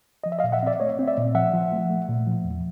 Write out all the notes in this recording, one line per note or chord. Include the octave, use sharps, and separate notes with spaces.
F3 D#5
E5
D#5 F5
A#2
E5 F#5
C4 D5 E5
A3 C#5 D#5
C4
D5 E5
A#2
F3 E5 F#5
F3
A3
A3
A#2
F3
E2